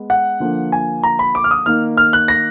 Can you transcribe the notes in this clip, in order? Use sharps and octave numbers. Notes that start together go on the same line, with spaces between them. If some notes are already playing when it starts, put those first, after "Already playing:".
Already playing: G#3 B3
F#5
D3 F3 A#3
G#5
A#5
B5
D6
F6
D#6
D#3 A#3 F6
F6
F#6
A#6